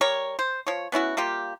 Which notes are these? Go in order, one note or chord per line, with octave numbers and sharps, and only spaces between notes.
G3 A#4 C#5
C5
F3 C#5
B3 C#4 E4 F#4
G3 A#3 F4 G4